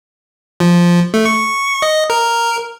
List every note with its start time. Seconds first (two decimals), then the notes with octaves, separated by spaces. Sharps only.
0.60 F3
1.14 A3
1.26 C#6
1.82 D#5
2.10 A#4